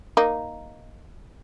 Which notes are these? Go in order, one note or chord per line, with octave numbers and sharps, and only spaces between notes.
A#3 D#4